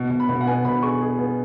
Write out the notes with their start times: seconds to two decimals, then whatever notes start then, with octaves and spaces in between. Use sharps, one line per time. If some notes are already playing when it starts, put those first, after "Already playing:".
Already playing: B2
0.10 B2
0.20 B5
0.29 B2
0.41 F#5
0.47 B3 G#5
0.65 B2 B5
0.83 G#4 C#6
1.01 G#4
1.19 B3